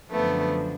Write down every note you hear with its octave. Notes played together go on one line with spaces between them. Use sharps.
F#2 D3 F3 A3 B3